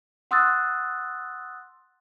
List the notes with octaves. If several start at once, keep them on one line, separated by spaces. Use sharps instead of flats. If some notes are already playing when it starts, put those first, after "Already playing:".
F#5 C6 D#6 E6 F#6 A6